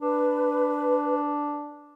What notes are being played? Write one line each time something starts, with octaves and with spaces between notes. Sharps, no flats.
D4 B4